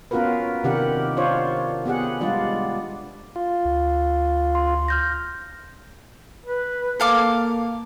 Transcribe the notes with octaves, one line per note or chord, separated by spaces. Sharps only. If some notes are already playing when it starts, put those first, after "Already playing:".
B3 C#4 F4 F#4 A#4 B4
C3 D#3 D4 G4 A#4 F#5
D4 F4 C5 C#5
B3 G4 G#4 F#5
G3 G#3 D4 F4 D5
F4
D2
C6
F6 G6 A#6
B4
A#3 A4 F5 D6